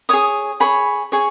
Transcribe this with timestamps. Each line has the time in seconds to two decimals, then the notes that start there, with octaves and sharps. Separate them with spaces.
0.09 G#4 C#5 D#6
0.60 G#4 C#5 B5
1.12 G#4 C#5